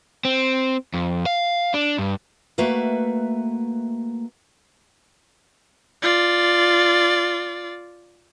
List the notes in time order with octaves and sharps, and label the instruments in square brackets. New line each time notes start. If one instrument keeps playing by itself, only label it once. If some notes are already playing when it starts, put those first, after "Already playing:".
[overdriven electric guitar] C4
F2
F5
D4
G2
[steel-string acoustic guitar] A3 A#3 F#4 B4 E5
[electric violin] F4 D5